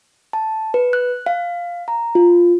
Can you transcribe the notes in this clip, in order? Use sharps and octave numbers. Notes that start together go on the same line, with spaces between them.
A5
B4
F#6
F5
A#5
F4